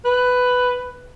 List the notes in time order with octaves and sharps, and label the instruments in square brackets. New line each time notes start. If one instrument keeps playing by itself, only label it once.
[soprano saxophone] B4